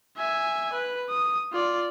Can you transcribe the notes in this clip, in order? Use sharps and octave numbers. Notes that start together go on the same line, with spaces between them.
E5 G#5
B4
D#6
F4 D5